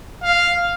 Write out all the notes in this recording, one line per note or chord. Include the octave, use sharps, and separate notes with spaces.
F5